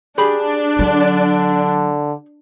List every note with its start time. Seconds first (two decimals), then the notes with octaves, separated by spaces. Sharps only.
0.18 D4 G4 G#4 B5
0.79 D3 F#3